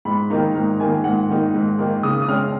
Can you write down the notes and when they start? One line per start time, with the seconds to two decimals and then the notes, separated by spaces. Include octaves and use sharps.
0.05 G#2 B5
0.30 D#3 A#3 D#4 A#5
0.55 G#2 A#5
0.79 D#3 A#3 D#4 G#5
1.04 G#2 F#5
1.29 D#3 A#3 D#4
1.55 G#2
1.79 D#3 A#3 D#4
2.03 C#3 D#6
2.22 D#6
2.28 G#3 C#4 F6